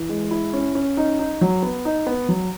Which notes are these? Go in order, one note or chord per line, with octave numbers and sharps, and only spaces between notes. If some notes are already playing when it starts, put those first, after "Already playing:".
Already playing: E3
G#3
E4
C#4
C#4
D#4
D#4
F#3
B3
D#4
B3
F#3